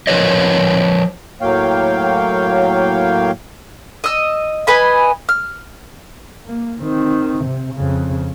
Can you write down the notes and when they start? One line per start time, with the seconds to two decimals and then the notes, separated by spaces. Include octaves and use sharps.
0.07 F3 A#4 B4 C#5 D#5
1.41 A2 F#3 A#3 C#5 F5 G5
4.04 D#5 E6
4.67 B4 D#5 G#5 B5
5.29 F6
6.46 A#3
6.82 D#3 C4
7.45 C3
7.74 F2 C#3